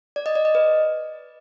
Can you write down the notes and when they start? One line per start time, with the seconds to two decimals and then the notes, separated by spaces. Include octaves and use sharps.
0.16 D5
0.26 D#5
0.35 D5
0.45 D#5
0.55 B4